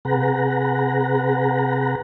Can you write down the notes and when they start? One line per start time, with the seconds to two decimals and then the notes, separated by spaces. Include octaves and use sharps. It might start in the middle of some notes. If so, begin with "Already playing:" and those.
0.05 C3 G#4 B4 F#5 A#5